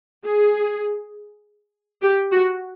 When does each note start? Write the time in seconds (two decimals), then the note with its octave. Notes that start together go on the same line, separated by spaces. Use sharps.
0.25 G#4
2.02 G4
2.32 F#4